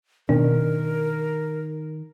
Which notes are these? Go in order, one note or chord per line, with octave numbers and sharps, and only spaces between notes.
B2 D#3 D4 A#4